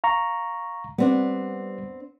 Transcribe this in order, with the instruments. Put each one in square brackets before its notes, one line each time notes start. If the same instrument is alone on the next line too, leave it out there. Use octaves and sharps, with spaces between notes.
[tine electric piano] F5 A#5 C#6
[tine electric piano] G3 B4 [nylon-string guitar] B3 C4 D4